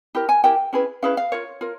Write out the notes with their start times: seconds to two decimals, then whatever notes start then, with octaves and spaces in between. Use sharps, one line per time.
0.15 E4 G4 A#4
0.29 G#5
0.44 E4 G4 A#4 G5
0.73 C#4 E4 G#4 B4
1.02 C#4 E4 G#4 B4 F5
1.17 F5
1.32 F4 A#4 C#5
1.61 F4 A#4